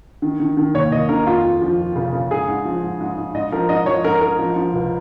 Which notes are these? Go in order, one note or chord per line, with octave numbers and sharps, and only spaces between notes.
D#3
D#3
D#3
D#2 C#5
D#2 D#5
D#3 A#4
F2 F4
F2
F3
F2
C#3
C#3
G#2 G#4
G#2
F3
G#2
G#2
G#2
G#2 D#5
F3 A#4
G#2 D#5
F3 C#5
G#2 A#4
G#2 A#4
F3
F3
C#2